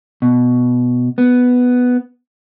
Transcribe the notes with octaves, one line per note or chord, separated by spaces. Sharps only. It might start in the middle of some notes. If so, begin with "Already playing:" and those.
B2
B3